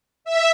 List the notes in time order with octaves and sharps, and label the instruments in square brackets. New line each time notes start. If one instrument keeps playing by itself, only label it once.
[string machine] E5